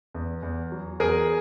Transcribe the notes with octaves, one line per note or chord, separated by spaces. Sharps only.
E2
E2
F#3
E2 G#4 A#4